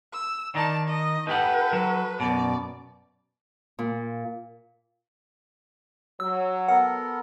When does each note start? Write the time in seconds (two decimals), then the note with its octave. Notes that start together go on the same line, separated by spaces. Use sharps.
0.13 E6
0.55 D#3 D#4 D5 A5
0.87 D#5
1.27 D#4 G4 A4 B4 F#5
1.73 F#3
2.20 F#2 B2 D5
3.79 A#2
6.20 F#3 E6
6.68 B3 A4 A#4 F#5